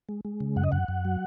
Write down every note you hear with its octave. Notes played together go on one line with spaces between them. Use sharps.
G#3
G#3
C#3
F#2 F#5
D#5
F#2 F#5
F#2
F#3